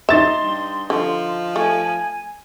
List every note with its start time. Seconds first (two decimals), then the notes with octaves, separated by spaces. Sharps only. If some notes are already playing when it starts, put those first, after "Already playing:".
0.09 D#4 E5 C6 A6 E7
0.43 G2
0.90 D3 F3
1.56 A3 G#5